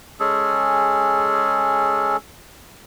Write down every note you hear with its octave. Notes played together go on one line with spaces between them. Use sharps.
G#3 C#4 G#4 A4